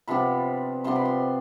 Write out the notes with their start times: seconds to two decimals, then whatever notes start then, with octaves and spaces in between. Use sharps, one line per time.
0.08 C3 F3 B3 D4 B5
0.84 C3 F3 B3 D4 C6
0.96 B5
1.05 C6